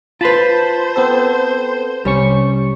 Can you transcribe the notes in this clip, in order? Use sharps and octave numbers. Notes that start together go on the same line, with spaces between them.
F4 B4 C5 A5 B5 C6
B3 C4 A4
C2 G3 C#4 C#6